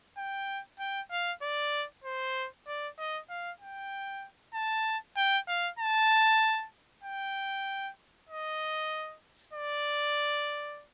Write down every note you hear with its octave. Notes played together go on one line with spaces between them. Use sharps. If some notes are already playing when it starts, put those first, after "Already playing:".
G5
G5
F5
D5
C5
D5
D#5
F5
G5
A5
G5
F5
A5
G5
D#5
D5